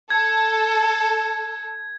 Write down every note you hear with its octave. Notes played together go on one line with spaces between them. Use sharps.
A4 G#6